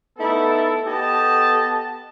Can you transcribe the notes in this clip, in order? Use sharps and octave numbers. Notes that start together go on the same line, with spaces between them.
A3 B3 D#4 E4 A4
B3 G4 A4 D#5 A5